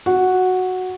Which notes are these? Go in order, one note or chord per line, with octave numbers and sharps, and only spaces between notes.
F#4